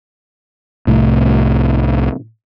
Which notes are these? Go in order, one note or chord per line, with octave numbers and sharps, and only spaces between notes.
C2 A2